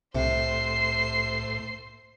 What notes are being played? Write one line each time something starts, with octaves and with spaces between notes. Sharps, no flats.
C2 A2 C3 C5 C7